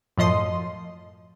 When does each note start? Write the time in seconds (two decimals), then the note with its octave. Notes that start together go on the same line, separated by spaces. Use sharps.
0.17 F#2 A2 F3 D#5 C6